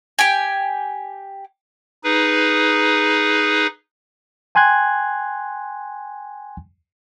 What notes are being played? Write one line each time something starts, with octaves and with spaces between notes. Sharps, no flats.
G4 G5 G#5
D#4 G#4 B4
G5 G#5 C6 F#6 G#6